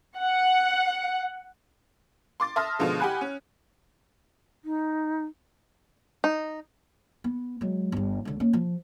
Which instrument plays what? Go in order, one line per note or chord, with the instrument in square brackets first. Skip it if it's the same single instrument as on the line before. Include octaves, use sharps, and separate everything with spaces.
[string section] F#5
[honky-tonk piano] C6 D6 A6
E5 A5 C6 D#6 F6 A#6
B2 D3 F3 G#3
G4 F#5 G#5 B5 F#6
C#4
[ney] D#4
[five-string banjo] D#4
[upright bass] B3
F#3 G#3
G1 G2
C#2 D3
A#3 C#4
F3